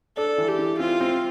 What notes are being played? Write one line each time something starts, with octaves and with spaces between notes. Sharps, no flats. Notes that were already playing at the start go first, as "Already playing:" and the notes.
D4 A4
E3
G4
E3
C4 F4
C4